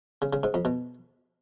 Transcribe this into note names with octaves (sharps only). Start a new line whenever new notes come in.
C#3
C#3
G#2
F2
B2